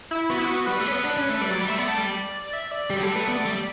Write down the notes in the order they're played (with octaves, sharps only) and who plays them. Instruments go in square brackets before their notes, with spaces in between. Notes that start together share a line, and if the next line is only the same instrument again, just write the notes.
[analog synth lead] E4
[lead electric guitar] B3 [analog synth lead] F#4
[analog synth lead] E4
F#4
[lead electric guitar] G3 [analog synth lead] B4
[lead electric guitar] A3
C#4
B3
D4
C#4
A3
[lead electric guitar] G3 [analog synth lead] D5
[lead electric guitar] F#3
G3
[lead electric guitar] A3 [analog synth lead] E5
[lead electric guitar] B3 [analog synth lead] D5
[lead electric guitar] A3
G3
[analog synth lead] E5
D5
[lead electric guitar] G3 [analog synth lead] G4
[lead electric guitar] F#3
[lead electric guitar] G3 [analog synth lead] A4
[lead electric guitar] A3 [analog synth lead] B4
[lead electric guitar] B3 [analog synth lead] D5
[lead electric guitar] A3
G3